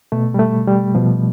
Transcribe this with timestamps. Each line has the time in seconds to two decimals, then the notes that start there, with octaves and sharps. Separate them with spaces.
0.12 B2 A3
0.34 G3
0.39 A3
0.68 G3
0.95 B2 F3